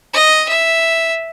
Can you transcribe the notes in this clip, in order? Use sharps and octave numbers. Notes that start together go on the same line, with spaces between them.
D#5
E5